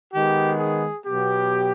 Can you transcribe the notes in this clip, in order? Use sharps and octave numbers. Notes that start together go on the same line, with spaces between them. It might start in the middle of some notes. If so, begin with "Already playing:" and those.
D#3 G#3 B3 G4
G#4
B2 F#3 B3 G4